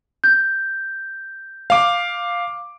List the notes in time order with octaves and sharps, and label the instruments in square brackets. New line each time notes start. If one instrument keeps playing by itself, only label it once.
[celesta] G6
[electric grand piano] F5 D6